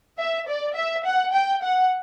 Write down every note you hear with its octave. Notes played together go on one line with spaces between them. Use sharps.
E5
D5
E5
F#5
G5
F#5